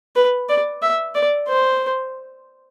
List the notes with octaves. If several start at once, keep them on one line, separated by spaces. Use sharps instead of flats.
B4
D5
E5
D5
C5